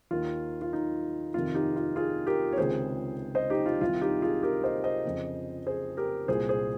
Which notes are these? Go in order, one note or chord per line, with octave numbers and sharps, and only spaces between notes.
D#2 D#3 F4
F4
D#4
F2 C3 D#3 F4
D#4 G4
F4
F4 G#4
G4 A#4
C#5
C#2 C3 D#3 G#4 C5
C5 D#5
D#4 G4
F4
C2 C3 D#3 F4
D#4 G4
F4 G#4
G4 A#4
C5 D#5
C5 D#5
F2 C#3
G#4 C5
G4 A#4
C2 A#2 G#4 C5
G#4 C5